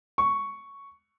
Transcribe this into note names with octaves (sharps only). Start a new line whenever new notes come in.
C#6